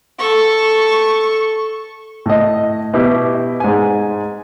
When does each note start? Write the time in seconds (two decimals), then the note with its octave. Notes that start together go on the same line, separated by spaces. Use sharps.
0.18 A4 C#6
2.26 A2 D#5
2.94 B2 E4 G4
3.60 G#2 G#5